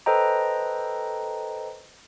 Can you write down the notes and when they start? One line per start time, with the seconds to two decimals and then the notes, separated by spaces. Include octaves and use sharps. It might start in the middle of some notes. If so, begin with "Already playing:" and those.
0.06 A4 B4 C5 D#5 G5 A#5